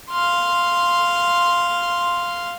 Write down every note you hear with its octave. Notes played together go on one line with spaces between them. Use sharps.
F5 C6